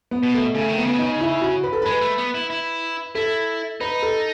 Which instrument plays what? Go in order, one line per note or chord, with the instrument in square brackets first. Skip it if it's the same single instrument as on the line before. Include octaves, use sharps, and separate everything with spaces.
[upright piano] B3
[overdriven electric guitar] B2
[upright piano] A3
[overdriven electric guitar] C#3 [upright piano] A3
[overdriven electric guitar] D#3
[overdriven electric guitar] C#3 [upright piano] B3
[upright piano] D#4
E4
F#4
B4
A4
[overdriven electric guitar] G#3 [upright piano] B4
[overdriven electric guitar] A3
B3
E4
E4
[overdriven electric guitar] E4 [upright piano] A4
[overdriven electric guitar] D#4 [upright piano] B4
[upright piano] A4